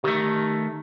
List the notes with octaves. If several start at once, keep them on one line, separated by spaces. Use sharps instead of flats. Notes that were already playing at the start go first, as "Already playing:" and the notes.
D#3 A3 G4